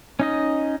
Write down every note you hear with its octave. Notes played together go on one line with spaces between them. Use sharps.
C#4 D#4 D#5